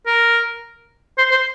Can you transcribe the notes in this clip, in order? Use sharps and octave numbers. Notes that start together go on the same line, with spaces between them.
A#4
C5
C5